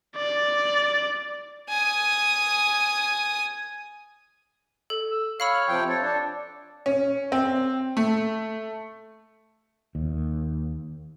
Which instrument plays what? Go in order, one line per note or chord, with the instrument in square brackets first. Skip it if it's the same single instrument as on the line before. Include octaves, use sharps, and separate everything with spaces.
[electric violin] D5
[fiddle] G#5 D#6
[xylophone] A4
[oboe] E6
[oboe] C#5 [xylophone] F5 B5 E6 [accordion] F6
[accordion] C3 F3 G5
[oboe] A4 [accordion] C#5
[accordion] D4
[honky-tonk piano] C#4
C4
A3
[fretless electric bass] D#2